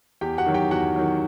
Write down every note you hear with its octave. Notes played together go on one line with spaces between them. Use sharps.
E2 G4 G5
F#4 F#5
D#3 F#3
G4 G5
E2 F#4 F#5
D#3 F#3